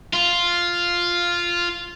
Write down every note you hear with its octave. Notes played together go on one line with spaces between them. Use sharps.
F4